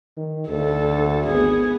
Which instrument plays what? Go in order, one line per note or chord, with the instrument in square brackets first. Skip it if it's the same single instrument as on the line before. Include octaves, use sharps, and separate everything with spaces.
[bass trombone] D#3
[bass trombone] D2 [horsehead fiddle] A4
[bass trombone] G#1 [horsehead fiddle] B3 G#4